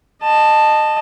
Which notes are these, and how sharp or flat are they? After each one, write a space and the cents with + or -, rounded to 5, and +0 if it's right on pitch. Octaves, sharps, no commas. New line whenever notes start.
D#5 -20 A5 +0